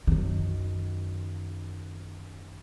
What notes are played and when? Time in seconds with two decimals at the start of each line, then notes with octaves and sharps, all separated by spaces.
0.07 F#2 D#3